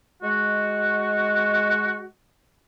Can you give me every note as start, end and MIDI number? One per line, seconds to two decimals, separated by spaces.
0.22 2.05 56
0.22 2.05 66